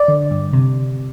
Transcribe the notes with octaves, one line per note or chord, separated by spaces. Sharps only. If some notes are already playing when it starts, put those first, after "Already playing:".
Already playing: D5
D3
G2
C3